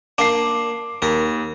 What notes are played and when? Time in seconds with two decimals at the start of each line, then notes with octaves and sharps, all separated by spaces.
0.18 A#3 D4 D6 C7
1.02 D#2 A#4